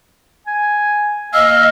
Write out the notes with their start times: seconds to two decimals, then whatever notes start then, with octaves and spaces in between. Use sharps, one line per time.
0.47 G#5
1.33 A#3 D#5 F5 E6